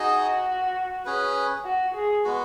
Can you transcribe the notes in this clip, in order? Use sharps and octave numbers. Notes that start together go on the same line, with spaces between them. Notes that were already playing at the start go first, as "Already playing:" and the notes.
Already playing: D#4 F#4 G#4 D#5
C#4 G#4 B4
F#4
G#4
G#3 B3 F#4